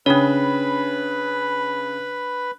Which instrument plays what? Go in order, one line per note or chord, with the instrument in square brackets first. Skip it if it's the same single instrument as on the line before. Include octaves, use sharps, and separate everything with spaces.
[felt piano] C#3 [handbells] D4 C#5 [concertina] B4 B5